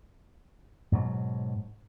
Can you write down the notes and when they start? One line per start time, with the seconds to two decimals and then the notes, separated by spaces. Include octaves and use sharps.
0.92 G#2 B2 F#3